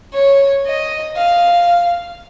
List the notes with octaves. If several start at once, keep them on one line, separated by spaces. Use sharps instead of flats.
C#5
D#5
F5